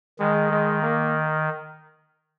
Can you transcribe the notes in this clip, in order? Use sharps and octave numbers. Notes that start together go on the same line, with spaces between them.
D#3 G#3
G#3
A#3